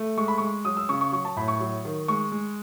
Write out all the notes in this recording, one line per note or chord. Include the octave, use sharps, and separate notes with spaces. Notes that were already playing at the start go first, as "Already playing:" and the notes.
Already playing: A3
G#3 C#6
B5
G#3 C#6
F#3 D#6
E6
C#3 C#6
C#6
F#3 C#6
A5
A2 B5
C#6
F#3
D#3
G#3 C#6
G#3